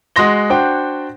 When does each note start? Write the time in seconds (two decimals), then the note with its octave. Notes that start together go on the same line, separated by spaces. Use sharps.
0.16 G#3 F#4 D#5 C6 A#6 G7
0.50 D4 F#4 C5 G5